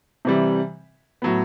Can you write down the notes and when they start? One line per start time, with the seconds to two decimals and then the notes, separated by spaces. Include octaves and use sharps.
0.25 C3 E3 G3
1.22 A2 F#3 B3